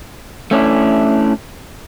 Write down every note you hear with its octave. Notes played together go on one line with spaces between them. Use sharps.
A3 C#4 D4 E4